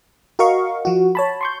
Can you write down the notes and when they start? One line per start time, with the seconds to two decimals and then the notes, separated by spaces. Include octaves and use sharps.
0.39 F#4 A#4 D#5 F5 C#6
0.85 F3 F#4
1.15 C#5 A5 B5
1.41 C6 C#6 G6